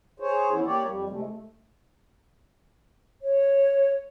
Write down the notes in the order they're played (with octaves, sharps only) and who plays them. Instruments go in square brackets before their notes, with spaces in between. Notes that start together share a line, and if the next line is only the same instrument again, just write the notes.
[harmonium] G#4 C5 C#5
E3 B3 C#4 E4
A#3 G4 C#5 D5
F2 G3
C3 G#3 A3
A3
[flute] C#5